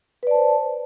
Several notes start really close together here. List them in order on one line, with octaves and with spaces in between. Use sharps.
B4 D5 A5 C5